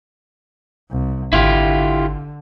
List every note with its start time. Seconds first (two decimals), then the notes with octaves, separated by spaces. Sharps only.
0.90 C2
1.33 G#1 D3 E4 F4 G4